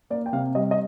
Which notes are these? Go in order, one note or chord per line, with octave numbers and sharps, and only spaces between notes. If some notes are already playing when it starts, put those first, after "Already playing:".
A#3 D5
G5
C3 F5
G3 D#5
D#5